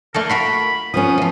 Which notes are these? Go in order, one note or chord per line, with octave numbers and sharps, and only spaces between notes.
A3 A#3 A4 A#4
F4 F#4 A#4 B5
F3 B3 C#4 D#6
E3 F3